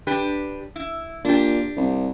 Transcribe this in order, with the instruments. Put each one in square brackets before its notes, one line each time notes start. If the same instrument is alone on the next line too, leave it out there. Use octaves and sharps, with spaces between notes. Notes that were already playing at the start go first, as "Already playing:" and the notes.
[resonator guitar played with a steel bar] D4 G4 B4
E4
[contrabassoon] A#2 [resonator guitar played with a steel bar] D4 G4
[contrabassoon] C2